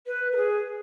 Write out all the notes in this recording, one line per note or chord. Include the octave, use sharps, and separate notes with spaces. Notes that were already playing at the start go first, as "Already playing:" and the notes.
B4
A#4
G#4